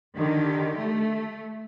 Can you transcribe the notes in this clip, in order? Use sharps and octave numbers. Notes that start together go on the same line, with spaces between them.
D3 D#3 G4
A3